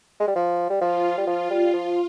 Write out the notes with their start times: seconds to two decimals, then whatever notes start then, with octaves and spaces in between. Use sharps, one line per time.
0.20 G#3
0.28 G3
0.36 F3
0.70 G3
0.81 F3 F4
1.18 G3
1.27 F3 F4
1.50 G3
1.73 F3